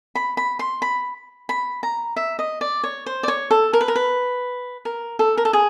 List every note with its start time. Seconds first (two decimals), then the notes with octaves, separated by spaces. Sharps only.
0.15 B5
0.37 B5
0.59 C6
0.82 B5
1.49 B5
1.83 A#5
2.16 E5
2.39 D#5
2.61 D5
2.84 C#5
3.06 C5
3.23 D5
3.28 C#5
3.51 A4
3.73 A#4
3.81 B4
3.88 A#4
3.96 B4
4.85 A#4
5.19 A4
5.37 A#4
5.45 A4
5.53 G#4